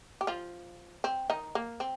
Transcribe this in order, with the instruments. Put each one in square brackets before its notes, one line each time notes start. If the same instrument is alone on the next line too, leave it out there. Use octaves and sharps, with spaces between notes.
[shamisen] G4
F3 F4
C4
D#3 D#4
A#3
C4